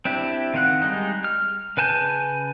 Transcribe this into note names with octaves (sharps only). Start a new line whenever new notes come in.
C4 D4 E4 G4
D#3 C4 F5 F#5 F#6
G3 G#3 D#4
F6
C#3 B4 G#5 A5 G6